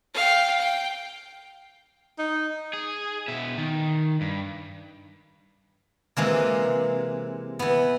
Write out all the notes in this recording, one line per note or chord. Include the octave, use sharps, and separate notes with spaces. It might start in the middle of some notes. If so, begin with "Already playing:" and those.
F5 G5
G5
D#4
G#4
B2 E5
D#3
G2
C3 E3 G#3 A#3
E3 B3